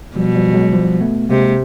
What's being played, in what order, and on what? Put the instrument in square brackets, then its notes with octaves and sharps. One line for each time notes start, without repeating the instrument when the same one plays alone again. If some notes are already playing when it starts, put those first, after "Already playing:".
[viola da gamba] B2 [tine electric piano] F3 G3
[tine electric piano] F3 G3
F#3 G#3
F3 G3
A3 B3
[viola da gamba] C3 [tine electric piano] G#3 A#3